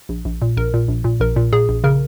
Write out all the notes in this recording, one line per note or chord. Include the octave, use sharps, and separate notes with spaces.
A#1
A#1
A#2
A#1 A#4
A#2
A#1
A#2
A#1 A#4
A#2
A#2 G#4
A#1
C#3 A#4